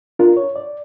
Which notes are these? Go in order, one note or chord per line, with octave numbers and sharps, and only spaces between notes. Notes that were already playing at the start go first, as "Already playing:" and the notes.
D4 F4 A#4
C#5
D5